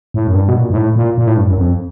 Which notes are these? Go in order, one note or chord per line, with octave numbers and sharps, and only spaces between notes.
A2
F#2
G2
B2
A#2
G#2
A2
A#2
A#2
A2
G2
F#2
F2